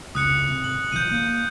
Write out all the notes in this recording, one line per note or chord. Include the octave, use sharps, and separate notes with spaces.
F1 C#2 D#6 F#6 C#7
G#1 C3
F#7
B1 D#3 F3 G6 D#7
A#3